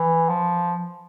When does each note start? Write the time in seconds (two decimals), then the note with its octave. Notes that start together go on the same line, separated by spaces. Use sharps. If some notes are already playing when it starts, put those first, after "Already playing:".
Already playing: E3
0.29 F3